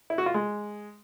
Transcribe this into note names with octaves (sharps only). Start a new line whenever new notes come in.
E4
F#4
F4
G#3